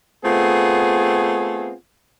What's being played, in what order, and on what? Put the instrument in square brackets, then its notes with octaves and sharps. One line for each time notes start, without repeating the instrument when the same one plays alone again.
[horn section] A3 B3 C4 F4 G#4